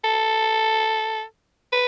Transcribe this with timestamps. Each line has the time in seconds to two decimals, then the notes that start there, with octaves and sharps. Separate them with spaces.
0.04 A4
1.73 B4